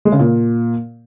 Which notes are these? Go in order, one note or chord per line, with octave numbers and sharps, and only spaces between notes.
G#3
C#3
A#2